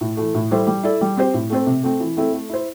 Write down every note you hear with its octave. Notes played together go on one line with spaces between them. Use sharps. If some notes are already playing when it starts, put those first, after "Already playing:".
A2
E3 A3
A2
G3 E4 A4 C5
G3
E4 A4 D5
G3
C4 G4 C5
A2
A3 C4 A4 C5
C3
A3 C4
E3
A3 C4 E4 A4
A3
E4 C5